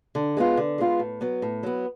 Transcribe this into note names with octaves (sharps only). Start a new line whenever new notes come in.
D3
G#3 B3 F4
D3
G#3 B3 F4
A2
F#3 B3
A2
F#3 B3